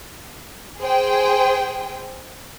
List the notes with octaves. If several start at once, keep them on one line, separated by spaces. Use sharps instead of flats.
G#4 C5 G5